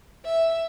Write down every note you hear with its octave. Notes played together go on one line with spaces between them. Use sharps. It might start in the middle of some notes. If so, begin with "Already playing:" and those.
E5